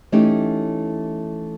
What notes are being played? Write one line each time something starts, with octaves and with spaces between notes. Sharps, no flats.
E3 A3 C#4 D#4 G4